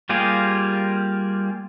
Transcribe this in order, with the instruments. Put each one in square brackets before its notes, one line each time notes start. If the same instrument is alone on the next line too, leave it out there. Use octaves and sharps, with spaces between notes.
[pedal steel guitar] G3 A#3 F4 G4 G#4